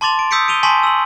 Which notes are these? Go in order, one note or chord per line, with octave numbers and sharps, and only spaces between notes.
A5 C6 D6 A6 F7
D7
D#6 E6 G6 B6 C#7 D7
D7 D#7 F7 G7
G#5 A5 C6 C#6 B6 F#7
E6 F#7